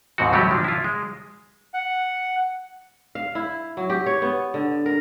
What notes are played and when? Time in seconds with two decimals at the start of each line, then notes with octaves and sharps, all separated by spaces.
0.18 D#2 G#2 B2 C4 F#4
0.32 A2 F#3 G3 A3 G4
0.51 F3 A#3 D4
0.64 E4 F4
0.84 G#3
1.74 F#5
3.15 F5
3.35 E4
3.77 F#3
3.90 G4
4.06 C#5
4.22 B3
4.54 D3
4.86 A#4